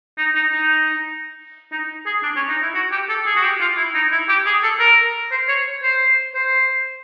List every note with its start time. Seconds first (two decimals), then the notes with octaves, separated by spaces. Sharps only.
0.18 D#4
0.35 D#4
0.52 D#4
1.72 D#4
2.06 G#4
2.23 D4
2.36 C#4
2.49 D#4
2.62 E4
2.74 F#4
2.91 G4
3.09 A4
3.26 G#4
3.36 F#4
3.43 G4
3.60 F4
3.77 E4
3.95 D#4
4.12 E4
4.28 G4
4.46 G#4
4.63 A4
4.79 A#4
5.31 C5
5.48 C#5
5.83 C5
6.34 C5